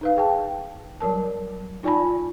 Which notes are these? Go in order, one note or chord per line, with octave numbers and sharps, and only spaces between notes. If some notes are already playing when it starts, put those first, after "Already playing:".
D#4 B4 F5
G#4 G5 A5
F#3 G3 A#4 A5
D#4 F4 D5 G#5 A5 B5